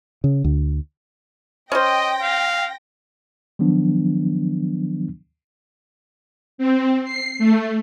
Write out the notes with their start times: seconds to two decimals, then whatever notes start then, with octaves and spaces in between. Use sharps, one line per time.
0.24 C#3
0.44 D2
1.72 C#4 C5 D#5 G5 A#6
2.23 F5
3.59 D#3 F3 F#3 B3 D4
6.58 C4
7.05 C7
7.38 A3